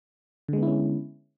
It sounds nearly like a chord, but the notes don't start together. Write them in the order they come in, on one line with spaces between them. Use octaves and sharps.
D3 G#3 B3 E4 C#4